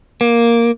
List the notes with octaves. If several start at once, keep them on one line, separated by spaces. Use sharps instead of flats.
A#3